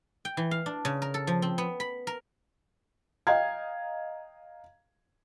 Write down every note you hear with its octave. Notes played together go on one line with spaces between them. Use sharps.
G5
E3
F5
D4
C#3
A#4
A4
F3
C4
B3
B5
A#4
D#5 F5 G5 A#5 G#6